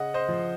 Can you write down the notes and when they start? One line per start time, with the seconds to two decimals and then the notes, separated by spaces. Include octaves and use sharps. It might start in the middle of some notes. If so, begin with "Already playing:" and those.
Already playing: C#3 D#5 F#5
0.14 C5 D#5
0.28 F3